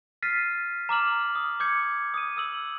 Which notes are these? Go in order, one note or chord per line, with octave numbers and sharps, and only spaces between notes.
F6 A6 B6 C7 D#7
A#5 D6 F6 F#7
D#6
D6 G6 G#6 C#7
D#6 D#7
D#6 E6 F#7